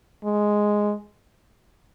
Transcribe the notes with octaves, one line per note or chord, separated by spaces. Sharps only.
G#3